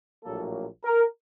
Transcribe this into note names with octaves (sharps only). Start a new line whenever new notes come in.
A#1 A2 F#3 A#3 A4
A#4